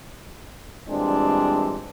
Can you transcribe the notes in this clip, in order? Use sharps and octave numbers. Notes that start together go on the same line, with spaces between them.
A#2 E3 G3 G#3 C4 D4